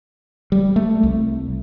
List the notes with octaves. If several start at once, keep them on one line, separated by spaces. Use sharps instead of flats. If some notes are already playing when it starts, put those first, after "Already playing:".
G3
A3
C2